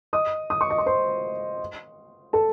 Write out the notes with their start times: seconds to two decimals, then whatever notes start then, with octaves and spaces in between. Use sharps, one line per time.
0.13 D#5 D#6
0.50 D#6
0.61 C#6
0.70 D#5 D#6
0.78 C#6
0.86 C5 C6
2.33 A4 A5